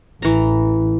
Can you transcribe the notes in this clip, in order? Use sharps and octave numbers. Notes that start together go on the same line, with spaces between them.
A1 E3 A#5